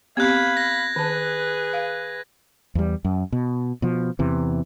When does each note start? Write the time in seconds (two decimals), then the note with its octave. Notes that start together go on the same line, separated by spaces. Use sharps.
0.17 B3 C4 G4 F5 B5 F#6 G#6
0.57 A#6
0.96 D#3 G#4 B4 A5
1.73 F5
2.75 E2 G3
3.05 F#2
3.32 B2
3.82 B2 F3
4.19 E2 C3 E3